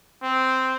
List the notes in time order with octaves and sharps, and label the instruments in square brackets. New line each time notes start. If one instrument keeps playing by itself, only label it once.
[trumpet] C4